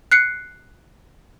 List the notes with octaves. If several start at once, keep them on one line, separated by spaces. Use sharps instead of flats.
F#6 C7 C#7